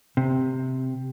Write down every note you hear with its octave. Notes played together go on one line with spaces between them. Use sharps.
C3